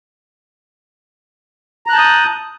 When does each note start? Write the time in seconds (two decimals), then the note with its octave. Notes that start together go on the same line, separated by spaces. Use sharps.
1.86 A#5
1.89 F#6
1.93 A5
1.96 G6
1.99 D#6